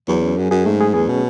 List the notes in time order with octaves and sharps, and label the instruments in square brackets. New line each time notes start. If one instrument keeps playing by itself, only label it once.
[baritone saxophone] E2 [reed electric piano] F#3
[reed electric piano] C#4
[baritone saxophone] F#2 [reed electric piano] G#4
[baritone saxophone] F#2 [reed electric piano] G#4
[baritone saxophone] G#2 [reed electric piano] A3
[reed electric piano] G#4
[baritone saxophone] E2 [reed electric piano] G#4
[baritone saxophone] B2 [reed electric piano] C#4